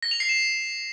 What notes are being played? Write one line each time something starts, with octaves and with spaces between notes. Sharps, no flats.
A#6
F7
C7
E7